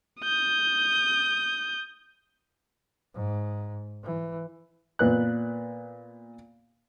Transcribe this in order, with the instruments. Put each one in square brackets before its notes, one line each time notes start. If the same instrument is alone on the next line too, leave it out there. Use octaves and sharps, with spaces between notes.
[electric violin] D#6 G6
[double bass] G#2
E3
[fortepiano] A#2 B3 F#6